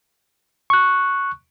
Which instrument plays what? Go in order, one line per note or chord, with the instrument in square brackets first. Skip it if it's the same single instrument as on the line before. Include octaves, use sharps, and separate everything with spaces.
[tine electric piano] C#6 F#6